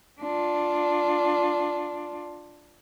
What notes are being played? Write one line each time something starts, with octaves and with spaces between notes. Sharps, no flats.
D4 F4